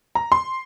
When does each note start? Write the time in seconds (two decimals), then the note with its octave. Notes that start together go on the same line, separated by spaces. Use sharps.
0.15 A#5
0.32 C6